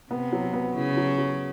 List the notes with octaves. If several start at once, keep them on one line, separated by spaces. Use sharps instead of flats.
C3 B3
F#3
B3
C#3 E4
F#3
F#3